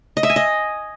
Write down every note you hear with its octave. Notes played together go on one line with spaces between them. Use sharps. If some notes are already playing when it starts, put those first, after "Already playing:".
D#5
E5
G#5
D#5